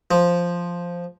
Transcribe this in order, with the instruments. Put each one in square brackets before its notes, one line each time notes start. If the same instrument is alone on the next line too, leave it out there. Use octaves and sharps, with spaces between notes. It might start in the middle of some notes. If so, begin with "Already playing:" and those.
[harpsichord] F3